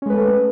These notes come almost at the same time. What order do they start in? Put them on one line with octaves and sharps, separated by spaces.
C#4 G#3 B4 A4 A3